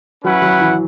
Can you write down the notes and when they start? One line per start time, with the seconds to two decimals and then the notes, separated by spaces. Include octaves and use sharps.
0.24 F#3 C#4 E4 B4 F#5
0.42 F#3
0.60 E3